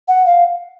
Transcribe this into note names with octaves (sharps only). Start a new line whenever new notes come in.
F#5
F5